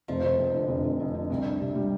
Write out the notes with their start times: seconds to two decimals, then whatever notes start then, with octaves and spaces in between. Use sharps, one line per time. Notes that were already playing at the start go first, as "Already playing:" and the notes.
0.08 F1 F3
0.23 F1
0.38 F2
0.54 D3
0.68 F1
0.84 F1
1.00 F2
1.14 D3
1.30 C2
1.46 D4
1.60 C3
1.75 G3